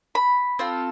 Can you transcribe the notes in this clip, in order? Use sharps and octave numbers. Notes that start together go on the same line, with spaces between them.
B5
C4 F4 A4